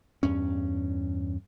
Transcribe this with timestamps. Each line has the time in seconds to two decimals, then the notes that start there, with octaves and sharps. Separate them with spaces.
0.23 E2 G2 C#4